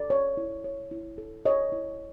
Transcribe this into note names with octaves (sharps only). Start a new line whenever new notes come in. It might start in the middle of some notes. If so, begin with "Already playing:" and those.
Already playing: A4 D5
C#5
E4
C#5
E4
A4
C#5 D#5
E4